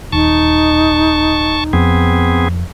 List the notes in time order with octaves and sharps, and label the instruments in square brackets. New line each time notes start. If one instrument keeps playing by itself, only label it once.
[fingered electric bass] D#1 [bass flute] D#4 [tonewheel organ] A5 C#6
[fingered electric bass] F2 [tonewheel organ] B3 C4 G#4